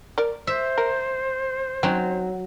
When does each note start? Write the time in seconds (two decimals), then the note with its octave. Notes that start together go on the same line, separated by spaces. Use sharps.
0.18 A#4 D5
0.47 C5 E5
0.78 A#4
1.83 F#3 C4 C#4 D#4